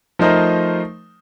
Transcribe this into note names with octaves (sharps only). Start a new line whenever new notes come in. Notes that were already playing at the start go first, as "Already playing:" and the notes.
F3 A3 D#4 A#4 C5 D#5